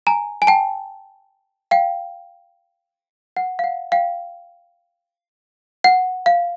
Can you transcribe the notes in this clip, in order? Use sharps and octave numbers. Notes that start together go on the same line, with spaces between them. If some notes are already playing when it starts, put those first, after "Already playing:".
G#5 A#5
G#5
G5 A5
F5 G5
F#5
F5
F#5
F5 G5
F#5
F5